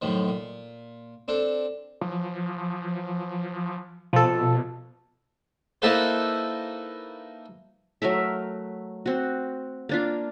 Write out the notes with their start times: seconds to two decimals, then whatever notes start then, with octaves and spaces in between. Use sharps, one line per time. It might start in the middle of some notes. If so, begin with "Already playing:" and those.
0.02 F#2 A2 D#3 F3
0.28 A#2
1.28 C4 D4 A4
2.01 F3
4.13 B2 F3 A4
5.82 A#3 D#4 E4 A4 B4 C5
8.02 F#3 A3 A#4 E5
9.06 C4 F#4
9.89 A#3 D4 F4